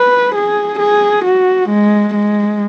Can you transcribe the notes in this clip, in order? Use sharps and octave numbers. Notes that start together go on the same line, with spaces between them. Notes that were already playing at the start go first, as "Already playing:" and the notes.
Already playing: B4
G#4
G#4
F#4
G#3
G#3